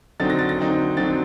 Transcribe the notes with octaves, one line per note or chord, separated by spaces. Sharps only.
D3 F#3 C4 D#4 A6
A#6
A6
A#6
D3 F#3 C4 D#4
D3 F#3 C4 D#4 A6